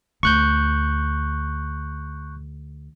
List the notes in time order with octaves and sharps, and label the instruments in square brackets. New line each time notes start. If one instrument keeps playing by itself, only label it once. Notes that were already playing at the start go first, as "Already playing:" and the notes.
[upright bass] D2 [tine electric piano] C#6 F#6 G6